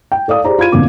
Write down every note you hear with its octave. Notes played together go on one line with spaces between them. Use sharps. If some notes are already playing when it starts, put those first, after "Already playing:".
G5
A4 D5 F5 D#6
G4 G#4 C5 D5 A#5
F4 B5 G#6 D#7
F2 B2 D3 A#3 D6